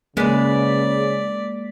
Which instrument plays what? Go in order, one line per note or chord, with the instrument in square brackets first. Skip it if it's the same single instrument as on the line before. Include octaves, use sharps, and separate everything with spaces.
[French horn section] C#3 [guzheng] G#3 B4 [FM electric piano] A#3 B6 [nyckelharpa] D5